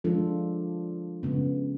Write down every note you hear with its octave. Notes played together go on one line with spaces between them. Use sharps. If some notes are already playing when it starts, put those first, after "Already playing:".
F3 G#3 D4 F4 A4
C#3 G#3 B3